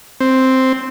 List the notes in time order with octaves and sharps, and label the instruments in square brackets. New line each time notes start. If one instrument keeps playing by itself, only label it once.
[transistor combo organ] C4